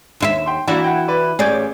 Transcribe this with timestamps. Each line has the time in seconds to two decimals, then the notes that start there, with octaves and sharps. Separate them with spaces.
0.20 D#2 E4 E5
0.46 G5 C6
0.67 E3 A#3 D4 E4 F#4
0.84 F#5 G5
1.08 B4 D5
1.39 A1 G#4 C#5 D5 G6